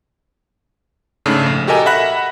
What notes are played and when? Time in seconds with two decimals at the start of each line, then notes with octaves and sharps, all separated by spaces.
1.26 G#2 C#3 A3 D4 A4
1.46 A#1
1.68 F#4 G4 A4 A#4 D#5 G#5
1.86 E5 F#5 B5 F#6 A#6